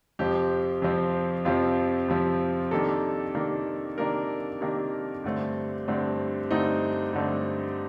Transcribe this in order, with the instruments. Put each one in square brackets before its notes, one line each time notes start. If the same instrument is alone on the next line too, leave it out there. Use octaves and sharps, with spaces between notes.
[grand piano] F2 C3 F3 C4 G4
F2 C3 F3 C4
F2 C3 F3 C4 F4
F2 C3 F3 C4
C3 D#3 A#3 D4 A4
C3 D#3 A#3 D4
C3 D#3 A#3 D4 A#4
C3 D#3 A#3 D4
G2 D3 A3 C4
G2 D3 A3 C4
G2 D3 A3 C4 D#4
G2 D3 A3 C4